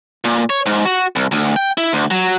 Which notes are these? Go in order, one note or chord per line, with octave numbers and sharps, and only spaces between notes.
A#2
C#5
G#2
F#4
C2
D2
G5
E4
D2
F#3